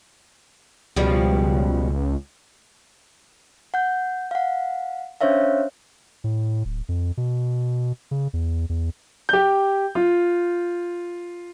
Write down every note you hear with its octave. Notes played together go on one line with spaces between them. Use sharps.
C#2 B2 F3 G3
F#5 G6
F5 F#5
C#4 D4 C5 C#5 E5 F5
A2
D1
F2
B2
C#3
E2
E2
G4 G6
F4